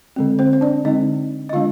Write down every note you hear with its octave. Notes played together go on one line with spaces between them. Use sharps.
D3 G#3 C4
C4 C5
C5
D4 D5
D3 G#3 C4 D#4 D#5
D#5
D3 G#3 D4 F4 F5